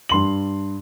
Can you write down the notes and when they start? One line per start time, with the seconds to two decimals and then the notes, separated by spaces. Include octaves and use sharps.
0.09 G2 C6 F#7